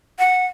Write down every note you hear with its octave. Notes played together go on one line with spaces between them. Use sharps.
F#5